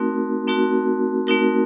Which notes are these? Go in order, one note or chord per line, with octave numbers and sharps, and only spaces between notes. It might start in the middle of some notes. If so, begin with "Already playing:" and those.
Already playing: A3 C4 D#4 F#4 A#4
A3 C4 D#4 F#4 A#4
A3 C4 D#4 F#4 A#4